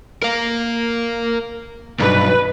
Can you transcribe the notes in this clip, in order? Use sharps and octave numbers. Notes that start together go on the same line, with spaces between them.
A#4 F5
B1 G2 B4